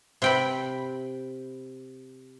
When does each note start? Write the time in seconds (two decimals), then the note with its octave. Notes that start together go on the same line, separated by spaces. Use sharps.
0.22 C3 G5 B5